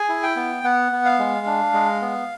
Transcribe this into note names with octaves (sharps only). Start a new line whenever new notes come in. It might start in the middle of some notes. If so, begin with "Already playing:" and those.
Already playing: G#4 G#5
E4
G5
B3
B3 F#5
B3
F5
G#3
D4
G#3
B3